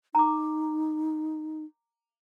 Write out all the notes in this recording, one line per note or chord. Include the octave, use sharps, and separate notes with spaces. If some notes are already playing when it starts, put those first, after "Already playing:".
D#4 A#5 D6